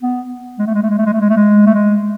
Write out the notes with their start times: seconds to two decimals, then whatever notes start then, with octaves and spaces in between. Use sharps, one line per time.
0.02 B3
0.59 G#3
0.67 A3
0.74 G#3
0.83 A3
0.90 G#3
0.98 A3
1.06 G#3
1.13 A3
1.21 G#3
1.30 A3
1.37 G#3
1.66 A3
1.74 G#3